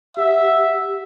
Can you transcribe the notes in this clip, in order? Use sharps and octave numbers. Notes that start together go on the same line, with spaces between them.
G4 E5 F#5